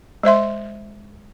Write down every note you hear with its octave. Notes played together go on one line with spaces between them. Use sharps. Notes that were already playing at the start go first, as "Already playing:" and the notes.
G#3 C5 E5 C6